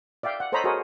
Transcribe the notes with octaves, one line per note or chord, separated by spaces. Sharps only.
D5 E5 F5 G5
F#5
A4 C5 C#5 D#5 A#5 B5
F#4 G#4 A#4 C5 C#5 D#5